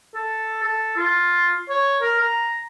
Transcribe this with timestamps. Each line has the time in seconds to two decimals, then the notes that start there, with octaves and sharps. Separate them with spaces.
0.14 A4
0.63 A4
0.96 F4
1.69 C#5
2.01 A#4
2.20 A#5